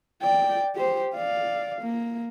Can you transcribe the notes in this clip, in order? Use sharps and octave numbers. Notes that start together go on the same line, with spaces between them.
D5 G5
G4 C5
D5 F5
A#3